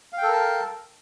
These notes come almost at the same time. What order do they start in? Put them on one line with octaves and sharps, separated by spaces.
F5 G5 A4 A#4 A5